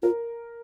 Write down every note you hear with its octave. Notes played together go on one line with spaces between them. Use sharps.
F4 A#4